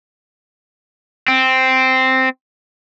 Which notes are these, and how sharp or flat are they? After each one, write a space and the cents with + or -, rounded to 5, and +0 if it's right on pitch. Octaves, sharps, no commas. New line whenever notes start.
C4 -5